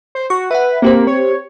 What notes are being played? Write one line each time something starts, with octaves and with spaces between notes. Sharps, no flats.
C5
F#4 C#6
B4 E5 F#5
A#3 C4 G4 C5
C#5